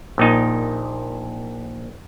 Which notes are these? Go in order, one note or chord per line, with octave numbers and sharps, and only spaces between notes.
A#1 A#2 D#4